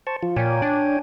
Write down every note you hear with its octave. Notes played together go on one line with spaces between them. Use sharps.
C5 A5 C#6
F3 F4
A#2 C#5 G5 G#5
D4